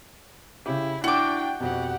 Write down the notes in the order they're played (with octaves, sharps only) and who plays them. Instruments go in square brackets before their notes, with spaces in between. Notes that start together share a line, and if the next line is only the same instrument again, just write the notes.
[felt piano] C#3 G4 [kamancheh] E4
[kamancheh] D4 G5 [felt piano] E4 [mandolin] F#4 D6
[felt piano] F2 B2 [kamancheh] G4 F#5